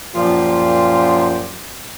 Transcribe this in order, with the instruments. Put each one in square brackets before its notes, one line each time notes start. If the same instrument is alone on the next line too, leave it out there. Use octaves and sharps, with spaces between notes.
[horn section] F#2 A#2 F3 F4 G4 C6